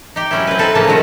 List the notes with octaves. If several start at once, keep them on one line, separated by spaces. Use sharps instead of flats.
D#4 G4
F#3 C#4 E4
C4 B4
D#4 A4 B4
A2 C#3 F3 A#3 A5
B2 D#3 F#3 G#3 F#4